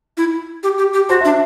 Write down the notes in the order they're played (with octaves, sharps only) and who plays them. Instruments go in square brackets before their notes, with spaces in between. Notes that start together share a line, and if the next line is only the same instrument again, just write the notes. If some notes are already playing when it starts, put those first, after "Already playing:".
[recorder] E4
G4
G4
G4
[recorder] F#4 [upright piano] C5
[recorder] D4 [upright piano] E5